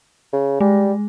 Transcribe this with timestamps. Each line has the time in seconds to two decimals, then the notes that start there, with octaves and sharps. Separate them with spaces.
0.33 C#3
0.60 G3 G#3